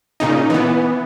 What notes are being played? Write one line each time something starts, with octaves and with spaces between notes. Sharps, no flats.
A#2 C#3 D#4
E3 B3